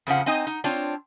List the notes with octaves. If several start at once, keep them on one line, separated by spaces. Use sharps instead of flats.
F2 C#3 F3 F#5
C4 D#4 D#5 G#5
D#4
C4 D4 F4 C#5